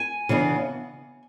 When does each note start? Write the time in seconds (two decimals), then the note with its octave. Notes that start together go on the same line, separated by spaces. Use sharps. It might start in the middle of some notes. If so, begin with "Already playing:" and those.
Already playing: G#5
0.29 C#3 E3 B3 D4